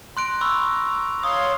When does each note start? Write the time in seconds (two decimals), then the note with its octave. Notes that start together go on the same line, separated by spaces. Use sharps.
0.17 A#5 C6 F#6 D7
0.41 B5 C#6 E6
1.23 C#5 F5 C6 D#6